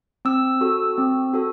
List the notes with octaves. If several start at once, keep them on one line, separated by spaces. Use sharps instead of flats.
C4 E6
F#4 A4
C4
F#4 A4